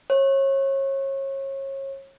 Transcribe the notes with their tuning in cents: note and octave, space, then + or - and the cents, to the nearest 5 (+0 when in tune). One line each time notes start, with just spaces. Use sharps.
C#5 -30